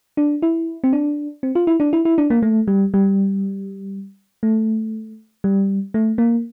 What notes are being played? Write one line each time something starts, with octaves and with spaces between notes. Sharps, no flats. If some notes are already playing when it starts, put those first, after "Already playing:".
D4
E4
C4
D4
C4
F4
E4
D4
E4
E4
D4
A#3
A3
G3
G3
A3
G3
A3
A#3